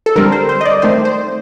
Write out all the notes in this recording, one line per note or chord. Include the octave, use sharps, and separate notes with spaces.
A4
D3 G3 C4 A#4
C5
C5
D#5
D5
D#3 A3 C4 C5
C5